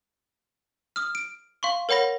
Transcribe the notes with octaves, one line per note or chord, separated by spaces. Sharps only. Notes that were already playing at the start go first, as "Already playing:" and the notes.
D#6 F6
D7
F5 C6 C#6
A#4 C#5 F#5 B5 A#6